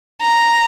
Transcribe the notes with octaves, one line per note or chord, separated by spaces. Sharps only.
A#5